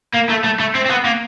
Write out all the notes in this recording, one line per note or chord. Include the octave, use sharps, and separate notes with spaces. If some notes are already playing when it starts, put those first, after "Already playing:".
A#3
A3
A3
A3
C4
C4
B3
A#3